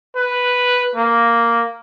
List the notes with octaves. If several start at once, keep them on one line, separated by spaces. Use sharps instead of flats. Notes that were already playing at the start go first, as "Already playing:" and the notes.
B4
A#3